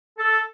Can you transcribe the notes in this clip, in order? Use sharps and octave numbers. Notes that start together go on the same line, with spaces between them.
A4